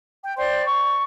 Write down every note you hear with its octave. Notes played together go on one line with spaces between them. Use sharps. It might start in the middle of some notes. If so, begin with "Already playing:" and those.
G5
C5 D5 G5 C6
C#6